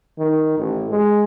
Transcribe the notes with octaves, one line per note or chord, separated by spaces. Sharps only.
D#3
A1
G#3